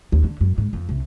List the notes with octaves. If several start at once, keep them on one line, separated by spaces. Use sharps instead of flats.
D#2
D3
F#2
G#2
F2
C2